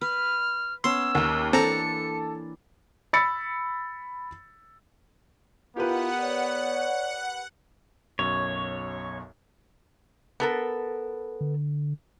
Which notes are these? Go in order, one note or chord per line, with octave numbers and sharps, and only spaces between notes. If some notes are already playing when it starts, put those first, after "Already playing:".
B4 F6
B3 C#4 C6 E6
D#2 A#3 G4
E3 C4 D4 A4 A#5 C#7
B5 E6 A6 C#7
B3 E4 F4 G4 A#4 B4 F#5
C#5 D5
B1 F#2 C#5
B3 A4 A#4
D3